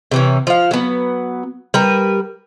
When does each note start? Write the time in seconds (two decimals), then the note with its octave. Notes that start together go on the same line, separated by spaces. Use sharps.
0.11 C3 E3 C#4
0.47 F3 F5
0.71 F#3 B3
1.74 G3 A#4 B4